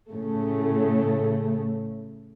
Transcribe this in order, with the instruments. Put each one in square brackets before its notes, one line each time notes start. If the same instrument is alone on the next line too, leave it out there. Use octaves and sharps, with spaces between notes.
[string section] A2 C#3 A3